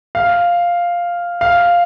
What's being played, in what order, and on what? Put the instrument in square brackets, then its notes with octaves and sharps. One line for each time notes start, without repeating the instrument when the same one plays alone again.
[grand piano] F5
F5